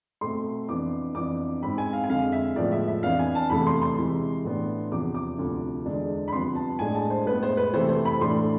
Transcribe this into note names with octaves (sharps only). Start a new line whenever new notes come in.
B2 A3 C4 C6
F2 E3 B3 D4 D6
F2 E3 B3 D4 D6
G#2 G#3 C4 B5
G#5
F5
G#5
F2 D3 G#3 F5
E5
A2 F3 G#3 B3 D5
E5
E5
F2 E3 B3 D4 F5
G#5
A5
E2 C3 E3 A3 B5
C6
C6
C3 E3 G#3
A2 E3 B3 D4
E2 C3 F3 D6
D6
D2 C3 F3
E2 D3 G#3 D4
B5
C2 C3 F3 B3 C6
A5
A2 G#3 D4 G#5
A5
C5
A2 G#3 B3 B4
C5
B4
C3 E3 A3 C4 C5
C5
B5
A2 E3 A3 D4 C6